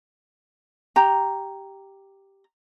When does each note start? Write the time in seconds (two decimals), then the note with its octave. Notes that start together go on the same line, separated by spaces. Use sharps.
0.96 G4 A#5